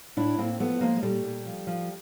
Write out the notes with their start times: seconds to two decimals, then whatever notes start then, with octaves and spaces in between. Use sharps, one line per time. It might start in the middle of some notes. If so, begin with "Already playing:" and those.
0.17 A2 D4 E4
0.38 A2 A#3 C4
0.60 F3 A3 B3
0.81 F3 G#3 A#3
0.96 G#3
1.03 A#2 G3 A3
1.24 A#2
1.46 F3
1.67 F3